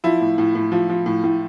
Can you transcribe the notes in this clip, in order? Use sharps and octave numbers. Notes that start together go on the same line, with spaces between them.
F3 E4
A2
A2
A2
F3
F3
A2
A2